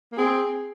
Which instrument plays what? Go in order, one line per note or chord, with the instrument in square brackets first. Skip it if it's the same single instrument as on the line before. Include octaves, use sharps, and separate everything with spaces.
[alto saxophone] A#3
[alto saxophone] C4 [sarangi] G#4